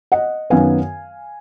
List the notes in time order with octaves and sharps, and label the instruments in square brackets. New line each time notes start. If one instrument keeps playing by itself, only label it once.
[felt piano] D#5 F#5
F#2 D#3 F#3 B3 F5 G#5